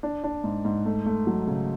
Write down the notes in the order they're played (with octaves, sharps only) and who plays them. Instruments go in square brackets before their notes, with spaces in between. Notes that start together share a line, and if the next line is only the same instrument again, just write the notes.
[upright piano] D4
D4
G#2
G#2
A3
A3
F#3
C#3